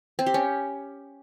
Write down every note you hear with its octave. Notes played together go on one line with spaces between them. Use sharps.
C4
G4
C#4